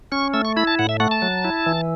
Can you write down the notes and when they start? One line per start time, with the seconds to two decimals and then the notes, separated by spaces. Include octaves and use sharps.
0.12 C#4 C#6
0.34 A3 E6
0.45 C#6
0.57 E4 B5
0.67 A5
0.79 A2 F#5
0.89 E5
1.00 A3 F#5
1.11 A5
1.22 F#3
1.44 E4
1.66 E3